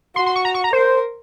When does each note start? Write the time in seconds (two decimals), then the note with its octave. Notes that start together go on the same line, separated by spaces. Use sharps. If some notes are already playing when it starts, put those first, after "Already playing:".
0.16 F#4 C6
0.26 C6
0.36 C#6
0.45 A#5
0.55 C#6
0.64 A#5
0.73 A#4 C5